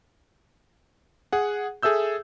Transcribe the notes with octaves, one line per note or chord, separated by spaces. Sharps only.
G#4 F#5
G#4 A4 E5 E6 G6